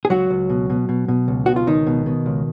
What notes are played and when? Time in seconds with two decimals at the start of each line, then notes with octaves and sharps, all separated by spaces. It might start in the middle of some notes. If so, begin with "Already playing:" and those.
0.05 G#4
0.10 C#2 F#3 F#4
0.30 C#2
0.49 B2
0.70 B2
0.89 B2
1.08 B2
1.28 C#2
1.46 B2 F#4
1.56 F4
1.67 C#2 D#3 D#4
1.87 B2
2.06 B2
2.26 C#2